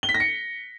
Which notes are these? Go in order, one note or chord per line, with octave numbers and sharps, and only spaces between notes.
G7
B6
A#6
C#7